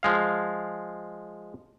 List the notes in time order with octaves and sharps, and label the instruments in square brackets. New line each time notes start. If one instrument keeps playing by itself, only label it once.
[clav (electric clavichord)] F3 G#3 F5